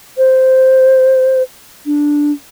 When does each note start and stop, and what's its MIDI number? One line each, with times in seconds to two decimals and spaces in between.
0.17 1.42 72
1.86 2.32 62